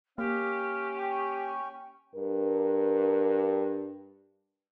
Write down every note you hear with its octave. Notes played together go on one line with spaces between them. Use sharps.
A#3 C#4 G4 F5 F6
G5 C#6
G2 A#4